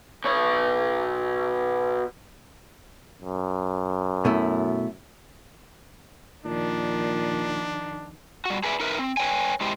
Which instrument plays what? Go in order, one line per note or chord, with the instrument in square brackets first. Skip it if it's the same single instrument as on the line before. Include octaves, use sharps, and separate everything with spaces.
[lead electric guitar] B2 C#5
[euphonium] F#2
[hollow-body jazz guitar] B2 A3 E4
[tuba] A#2 [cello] D#3 F3 [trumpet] D4
[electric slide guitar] G3 F#4
G#4 B4 D5 E5
D#4 A#4 B4 E5
C4
B4 C#5 G5 G#5
G#3 E4 G4 C5